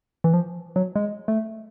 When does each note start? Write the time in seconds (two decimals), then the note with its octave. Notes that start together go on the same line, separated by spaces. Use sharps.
0.24 E3
0.33 F3
0.76 F#3
0.96 G#3
1.28 A3